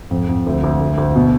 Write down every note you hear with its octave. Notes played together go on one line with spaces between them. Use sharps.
F2
F2
D2
D2
D2
D2
B2